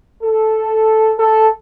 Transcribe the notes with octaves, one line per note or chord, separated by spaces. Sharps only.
A4
A4